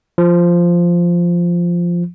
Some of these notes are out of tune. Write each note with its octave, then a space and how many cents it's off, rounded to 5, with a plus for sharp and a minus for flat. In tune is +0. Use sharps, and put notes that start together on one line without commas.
F3 -5